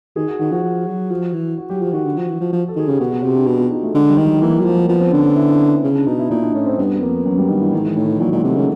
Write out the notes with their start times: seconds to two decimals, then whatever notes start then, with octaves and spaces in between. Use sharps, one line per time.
0.16 D#3 G#4
0.28 F#4
0.40 D#3 F#4
0.51 F3 F#4
0.63 F3
0.86 F#3
1.11 F3
1.34 E3
1.58 F#4
1.70 F#3 G4
1.81 F3 G4
1.93 D#3 F#4
2.05 D3
2.17 F3
2.29 E3
2.41 F3
2.52 F3
2.68 A4
2.76 D#3 G#4
2.88 C#3 G4
3.00 B2 F#4
3.11 G#4
3.23 C3 G4
3.35 D4
3.46 B2
3.59 F4
3.71 D#4
3.83 A3
3.94 D3 G#3
4.10 G3
4.17 D#3
4.26 F#3
4.42 E3 A#3
4.60 F#3
4.65 F3
4.79 A#3
4.89 F3 B3
5.01 C4
5.08 D4
5.12 D3 C#4
5.21 D4
5.24 C#4
5.36 E4
5.84 C#3
5.95 D4
6.07 B2 D#4
6.19 E4
6.30 A#2 D#4
6.43 D4
6.54 A2 C#4
6.67 C4
6.78 G2 B3
6.96 B3
7.02 F2 A#3
7.26 F#2 F#3
7.38 G3
7.49 G2 D#3
7.61 E3
7.73 G#2 D#3
7.85 E3
7.96 A2 D#3
8.08 E3
8.20 A#2 F#3
8.32 A#2 G#3
8.44 C3 A3
8.56 C#3 A#3